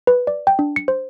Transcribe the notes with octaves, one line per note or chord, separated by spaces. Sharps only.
B4
D5
G5
D4
C#7
C5